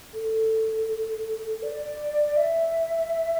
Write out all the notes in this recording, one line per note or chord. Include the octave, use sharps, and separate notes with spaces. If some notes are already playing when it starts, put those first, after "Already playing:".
A4
D5
E5